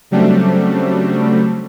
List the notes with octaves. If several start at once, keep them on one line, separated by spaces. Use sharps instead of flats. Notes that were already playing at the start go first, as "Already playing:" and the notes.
C#3 F#3 G3 A3 C4 D4